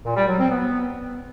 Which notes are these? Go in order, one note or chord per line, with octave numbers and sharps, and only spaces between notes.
A#2
G3
F#3
C4
B3